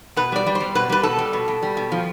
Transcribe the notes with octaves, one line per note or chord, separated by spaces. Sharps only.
B2 B4
G3 D5
G3
C5
G3
B2 B4
G3 B4
B2 A4
G3
B2
B2
G3
B2
F3